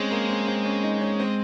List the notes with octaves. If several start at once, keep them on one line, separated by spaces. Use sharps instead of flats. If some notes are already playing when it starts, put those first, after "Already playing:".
Already playing: G#3 C4 C#4
A#3
C4
C4
C#4
D#4
C#4
C4